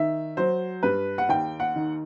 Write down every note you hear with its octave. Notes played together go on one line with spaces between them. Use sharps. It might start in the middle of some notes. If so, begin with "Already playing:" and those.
Already playing: D#3 E5
F#3 C5
G2 B4
F#5
D#2 G5
F#5
D#3